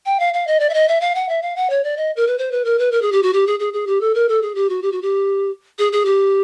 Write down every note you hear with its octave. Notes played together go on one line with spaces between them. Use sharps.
G5
F5
F5
D#5
D5
E5
D#5
E5
F5
F#5
E5
F5
F#5
C#5
D5
D#5
A#4
B4
C5
B4
A#4
B4
A#4
G#4
G4
F#4
G4
G#4
G#4
G#4
G4
A4
A#4
A4
G#4
G4
F#4
G4
F#4
G4
G#4
G#4
G4